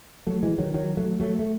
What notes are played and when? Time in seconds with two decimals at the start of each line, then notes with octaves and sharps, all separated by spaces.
0.27 F#3 A3
0.43 E3 G#3
0.58 D#3 F#3
0.74 D#3 F#3
0.97 F#3 A3
1.20 F#3 A3
1.39 A3